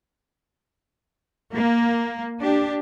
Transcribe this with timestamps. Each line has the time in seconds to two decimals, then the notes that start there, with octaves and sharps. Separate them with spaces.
1.50 A#3
2.39 D4 G4